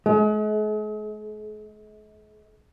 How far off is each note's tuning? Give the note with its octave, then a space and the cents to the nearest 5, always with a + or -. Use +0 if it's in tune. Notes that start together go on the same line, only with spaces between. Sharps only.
G#3 +45